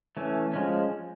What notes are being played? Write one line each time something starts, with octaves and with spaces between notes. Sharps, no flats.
E3 A3 C#4
F3 G#3 C#4